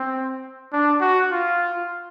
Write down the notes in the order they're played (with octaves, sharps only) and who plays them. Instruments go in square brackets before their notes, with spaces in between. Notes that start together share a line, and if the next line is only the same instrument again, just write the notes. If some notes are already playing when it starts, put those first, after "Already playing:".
Already playing: [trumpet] C4
D4
F#4
F4